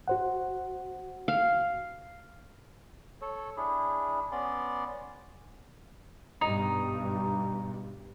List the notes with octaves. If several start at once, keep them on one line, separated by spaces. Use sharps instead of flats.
F#4 C5 F#5
F5
A4 C#5
D4 E4 G#4
B3 C#4 D5 C6
G2 B2 G3 D#4